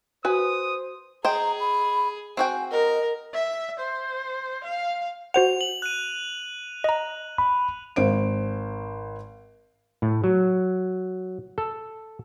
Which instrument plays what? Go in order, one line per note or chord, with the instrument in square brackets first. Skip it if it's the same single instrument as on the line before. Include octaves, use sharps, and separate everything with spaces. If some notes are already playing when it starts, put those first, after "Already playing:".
[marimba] F#4 [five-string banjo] B4 G#5 [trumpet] C5 [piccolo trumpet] D#6
[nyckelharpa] G#4 [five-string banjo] C5 D#5 G5 [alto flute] A#5
[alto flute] B5
[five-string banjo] C4 F#4 G5 [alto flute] G#5
[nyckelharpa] A#4 [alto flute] D#5
[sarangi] E5
C5
F5
[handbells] F#4 C5 F#5 [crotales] F7
[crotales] F#7
F#6 D#7
[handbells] D#5 A#5
[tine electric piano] B5
[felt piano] G#1 C5 D7
[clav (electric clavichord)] A2
F#3
A4